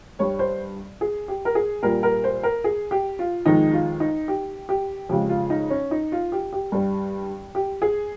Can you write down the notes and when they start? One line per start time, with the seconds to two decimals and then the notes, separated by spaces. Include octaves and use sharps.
0.19 G2 G3 C#5
0.39 C5
1.01 G#4
1.28 G4
1.45 A#4
1.55 G#4
1.82 A#2 G3 A#4
2.03 A#4
2.24 C5
2.43 A#4
2.64 G#4
2.91 G4
3.19 F4
3.45 F2 D#3 G#3 D#4
3.73 F4
4.00 D#4
4.28 G4
4.69 G4
5.09 F2 C#3 G#3 G4
5.29 F4
5.50 D#4
5.70 C#4
5.91 D#4
6.12 F4
6.32 G4
6.53 G4
6.72 G2 G3
7.55 G4
7.82 G#4